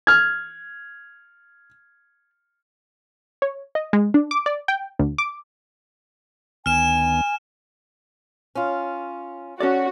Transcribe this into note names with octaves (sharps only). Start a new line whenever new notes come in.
F6 G#6
C#5
D#5
G#3
D4
D6
D5
G5
D2
D6
D2 D#3 B3 G#5 F6 E7
C#4 F4
C#4 F#4 A4 D5